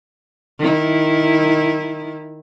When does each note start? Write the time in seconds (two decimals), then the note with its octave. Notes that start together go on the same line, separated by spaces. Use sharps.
0.59 D#3 E4